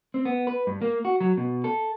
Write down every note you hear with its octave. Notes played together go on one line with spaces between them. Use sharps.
C4
B3
B4
G2
A#3
F#4
F#3
B2
A4